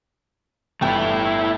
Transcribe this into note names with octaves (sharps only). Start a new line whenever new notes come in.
G1 A3 E4 G5